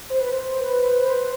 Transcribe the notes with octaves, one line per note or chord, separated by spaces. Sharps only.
C5
B4
C5
B4
B4
B4
C5